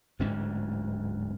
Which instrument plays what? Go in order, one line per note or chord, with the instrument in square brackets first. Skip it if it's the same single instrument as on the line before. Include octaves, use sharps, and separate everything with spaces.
[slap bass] D1 D2 G#2 C#4